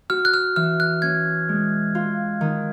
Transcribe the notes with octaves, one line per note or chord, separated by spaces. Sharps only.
F#4 F6
F#6
F6
E3 F6
F#6
C#4 G#6
G#3
F4
D#3